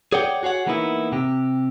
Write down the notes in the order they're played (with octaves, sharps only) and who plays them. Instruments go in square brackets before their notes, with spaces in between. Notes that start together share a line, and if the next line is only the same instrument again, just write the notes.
[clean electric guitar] G#4 C#5 D5 F#5 G5
F#4 G#4 C#5 F#5
E3 A#3 B3 D#4 E4
C3 G4